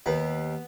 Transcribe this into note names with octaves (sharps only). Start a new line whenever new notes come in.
D#2 B3